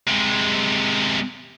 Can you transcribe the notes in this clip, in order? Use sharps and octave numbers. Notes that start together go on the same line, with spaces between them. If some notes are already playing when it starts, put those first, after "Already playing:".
C3 G#3